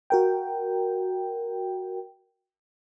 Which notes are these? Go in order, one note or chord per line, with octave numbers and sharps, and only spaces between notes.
F#4 A#4 G5